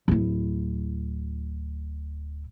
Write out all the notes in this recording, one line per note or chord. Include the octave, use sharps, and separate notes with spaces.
D1 E4